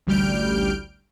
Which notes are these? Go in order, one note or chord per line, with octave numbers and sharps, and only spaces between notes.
A1 D2 G3 F6 G6 D7